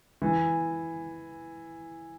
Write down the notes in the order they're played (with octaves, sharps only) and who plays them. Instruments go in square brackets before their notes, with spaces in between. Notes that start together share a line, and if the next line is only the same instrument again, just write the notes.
[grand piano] E3